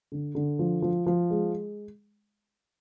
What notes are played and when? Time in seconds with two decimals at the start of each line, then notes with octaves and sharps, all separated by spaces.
0.12 D3
0.35 D3
0.59 F3
0.82 F3
1.06 F3
1.30 G#3